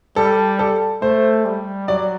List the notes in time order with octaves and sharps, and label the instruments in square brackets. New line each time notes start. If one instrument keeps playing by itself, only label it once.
[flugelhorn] G3 [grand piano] A4
[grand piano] A4
[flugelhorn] A3 [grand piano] C5
[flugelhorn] G3
[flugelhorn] F#3 [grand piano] D5